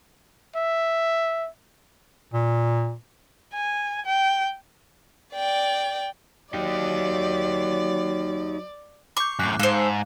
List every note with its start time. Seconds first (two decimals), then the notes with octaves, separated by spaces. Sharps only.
0.56 E5
2.33 A#2
3.53 G#5
4.06 G5
5.35 D5 G5
6.54 F#3 D#4 G4 D5
9.17 C#6 D6 G6
9.40 F#2 A2 F#6
9.59 G#2 A4 C5 F5